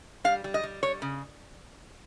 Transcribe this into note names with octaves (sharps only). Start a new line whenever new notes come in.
G3 F5
G3
D#5
G3
G3 C#5
C#3